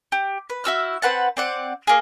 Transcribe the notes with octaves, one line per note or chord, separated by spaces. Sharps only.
G4
B4
E4 F#4 E6 F6
C4 B4 F#5 A5
C4 D5 F#5
A#3 G#4